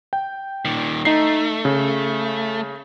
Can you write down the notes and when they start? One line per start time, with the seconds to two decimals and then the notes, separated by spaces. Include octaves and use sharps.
0.13 G5
0.65 A#2 D#3
1.05 A3 D#4 C7
1.65 C#3